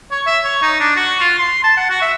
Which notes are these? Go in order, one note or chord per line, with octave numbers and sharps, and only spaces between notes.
C#5
E5
C#5
D#4
D4
F#4
F4
C6
A5
F#5
F#4
E5